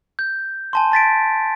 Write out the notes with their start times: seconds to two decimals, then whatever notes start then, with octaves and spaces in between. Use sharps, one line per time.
0.19 G6
0.73 G#5 A5 C6
0.92 A5 A6 B6 D7